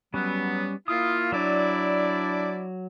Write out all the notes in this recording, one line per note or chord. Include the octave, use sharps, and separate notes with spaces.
F#3 G3 B3 C#4
A#3 E4 F4 D#6
F#3 D4 E4 D5